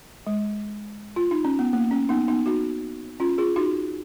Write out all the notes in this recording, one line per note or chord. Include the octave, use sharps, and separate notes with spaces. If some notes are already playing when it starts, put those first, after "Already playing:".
G#3
F4
D#4
C#4
B3
A#3
C#4
B3 D#4
B3 D#4
D#4 F#4
C#4 F4
F4 G#4
D#4 F#4